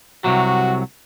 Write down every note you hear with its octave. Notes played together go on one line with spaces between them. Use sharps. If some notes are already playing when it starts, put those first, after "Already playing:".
C2 C3 F#3 F#4